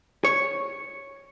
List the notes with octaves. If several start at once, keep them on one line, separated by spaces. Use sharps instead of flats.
C#5